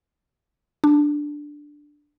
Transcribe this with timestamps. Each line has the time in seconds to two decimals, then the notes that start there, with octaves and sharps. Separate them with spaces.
0.84 D4